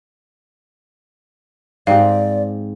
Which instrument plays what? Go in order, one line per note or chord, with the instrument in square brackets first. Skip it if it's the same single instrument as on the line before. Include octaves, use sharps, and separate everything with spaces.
[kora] G#2 C4 G4 [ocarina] D5 [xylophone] F5